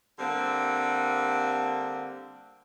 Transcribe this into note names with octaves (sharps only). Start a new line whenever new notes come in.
D3 G3 A#3 C4